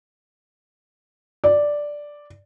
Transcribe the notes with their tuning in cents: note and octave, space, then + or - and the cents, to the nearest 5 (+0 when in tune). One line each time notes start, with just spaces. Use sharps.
D5 +0